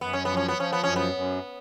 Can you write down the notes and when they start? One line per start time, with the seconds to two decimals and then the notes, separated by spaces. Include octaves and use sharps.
0.01 F#2 B3
0.13 C#4
0.25 F3 B3
0.37 C#4
0.48 B3
0.57 F3 C#4
0.73 B3
0.84 F#2 C#4
0.96 B3
1.15 F#2